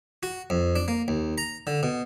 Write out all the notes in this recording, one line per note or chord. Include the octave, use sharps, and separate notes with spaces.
F#4
F2
D4
A#3
D#2
A#5
D3
B2